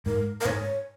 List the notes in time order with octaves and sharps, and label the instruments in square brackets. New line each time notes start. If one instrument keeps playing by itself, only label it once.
[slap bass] G#2 [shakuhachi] A#4
[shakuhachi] A#4
[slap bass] G#2 [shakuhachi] C#5